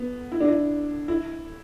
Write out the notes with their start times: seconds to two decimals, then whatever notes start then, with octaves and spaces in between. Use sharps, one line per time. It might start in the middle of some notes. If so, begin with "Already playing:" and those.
Already playing: B3
0.32 E4
0.40 D4
0.48 E4
1.08 E4